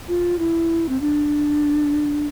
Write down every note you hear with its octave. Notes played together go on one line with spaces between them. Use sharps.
F4
E4
C4
D4